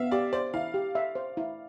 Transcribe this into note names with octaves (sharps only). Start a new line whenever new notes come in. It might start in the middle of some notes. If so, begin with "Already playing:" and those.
Already playing: B3 E5 F5
G4 D5
C5 D5
E4 F5
G4
E5
C5
E4